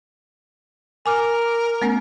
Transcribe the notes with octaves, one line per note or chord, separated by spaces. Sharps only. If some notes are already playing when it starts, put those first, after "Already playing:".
A#4 G#5 D6 F6
A3 B3 C#4